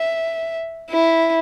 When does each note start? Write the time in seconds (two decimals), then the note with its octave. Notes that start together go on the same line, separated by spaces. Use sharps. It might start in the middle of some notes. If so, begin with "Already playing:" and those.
Already playing: E5
0.90 E4